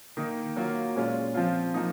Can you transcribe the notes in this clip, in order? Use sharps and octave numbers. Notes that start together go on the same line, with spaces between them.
D#3 A#3 D#4
F#3 A#3 F4
A#2 G#3 C#4 F4
F3 C4 F4
F3 A#3 D#4